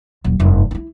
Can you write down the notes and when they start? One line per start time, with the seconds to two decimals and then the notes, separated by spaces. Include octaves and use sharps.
0.24 D#1 F#3
0.40 F1 G2
0.71 D4 E4